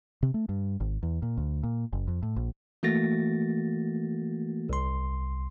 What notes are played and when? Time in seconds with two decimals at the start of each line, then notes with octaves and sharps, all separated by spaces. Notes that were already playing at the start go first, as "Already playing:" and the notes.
0.23 C3
0.34 A3
0.49 G2
0.80 G#1
1.03 E2
1.22 A#2
1.38 D2
1.63 A#2
1.93 F#1
2.08 F2
2.23 A2
2.36 A#1
2.83 E3 A3 A#3 F#4 A6 A#6
4.69 C2 C6